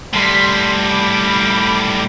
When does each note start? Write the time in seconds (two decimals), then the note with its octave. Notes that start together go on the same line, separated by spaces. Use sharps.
0.13 A2 G3 C6 B6
0.83 B5 D6